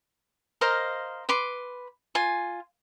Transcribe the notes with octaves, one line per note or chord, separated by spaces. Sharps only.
A#4 C5 D#5 F5
B4 C6 D6
F4 G#5